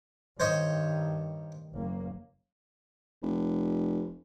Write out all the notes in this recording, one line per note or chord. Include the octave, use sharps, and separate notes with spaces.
G2 D#3 C5 C#5 D#5
F#1 A#3
F1